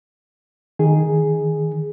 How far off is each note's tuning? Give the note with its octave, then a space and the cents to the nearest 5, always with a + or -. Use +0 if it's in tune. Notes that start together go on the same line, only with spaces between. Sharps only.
D#3 +0 G#4 +0